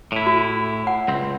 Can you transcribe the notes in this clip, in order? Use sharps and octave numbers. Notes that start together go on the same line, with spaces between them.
A2 E4
F#4
F#5
C#2 C4